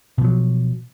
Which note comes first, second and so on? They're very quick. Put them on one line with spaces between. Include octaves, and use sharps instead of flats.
B2 F3 F#3